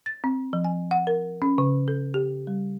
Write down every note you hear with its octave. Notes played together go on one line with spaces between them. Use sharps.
A6
C4
F3
G#5
F#5
A#4
C#4
C#3
A4
G4
G3